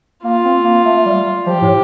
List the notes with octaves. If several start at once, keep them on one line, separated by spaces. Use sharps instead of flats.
A#3 F4
C4
A#3
A3
G3
F3 G4
A2